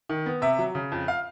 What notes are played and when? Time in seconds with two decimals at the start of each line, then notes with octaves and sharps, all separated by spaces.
0.09 D#3
0.26 B3
0.42 C3 E5
0.59 F#3
0.75 C#3
0.92 F2
1.08 F5